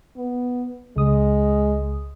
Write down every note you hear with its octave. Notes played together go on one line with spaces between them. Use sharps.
B3
C#2 G#3 D#6